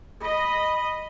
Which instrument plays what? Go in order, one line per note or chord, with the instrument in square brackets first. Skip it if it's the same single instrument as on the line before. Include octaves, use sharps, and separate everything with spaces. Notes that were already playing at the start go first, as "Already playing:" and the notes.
[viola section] D#5 [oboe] B5